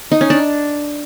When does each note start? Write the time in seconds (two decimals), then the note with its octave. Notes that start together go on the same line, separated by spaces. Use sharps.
0.12 D#4
0.21 C#4
0.30 D4